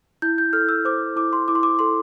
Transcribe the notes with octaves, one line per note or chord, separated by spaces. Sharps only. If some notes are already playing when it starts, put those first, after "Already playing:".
E4 G6
G6
A4 F6
E6
C5 D6
E4 D6
C6
E4 D6
C6
D6
A4 C6